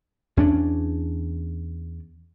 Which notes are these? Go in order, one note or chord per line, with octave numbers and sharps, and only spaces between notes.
E2 C#4 D4